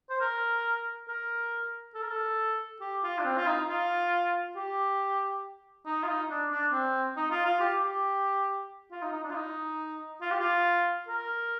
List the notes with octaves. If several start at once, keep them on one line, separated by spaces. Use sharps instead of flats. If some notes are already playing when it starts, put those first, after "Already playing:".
C5
A#4
A#4
A4
A#4
A4
G4
F4
D4
C4
F4
D#4
F4
G4
D#4
F4
D#4
D4
D4
C4
D#4
F4
F4
G4
G4
F4
D#4
D#4
D4
F4
D#4
F4
G4
F4
A#4